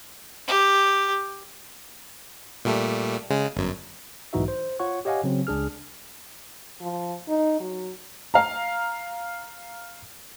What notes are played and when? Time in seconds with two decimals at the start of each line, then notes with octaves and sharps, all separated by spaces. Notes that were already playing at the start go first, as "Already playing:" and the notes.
0.48 G4
2.65 A#2 G3 A3
3.30 C#3 G#3
3.56 G1 F#2
4.33 B1 G#2 E3 D#4 F#4 E5
4.48 C5
4.79 F4 C#5 F#5 C#6
5.05 G4 C#5 D#5 F5 F#5 G#5
5.24 C#3 F#3 C4
5.47 C#2 D4 G#4 F6
6.81 F3
7.28 D#4
7.60 F#3
8.34 F5 A#5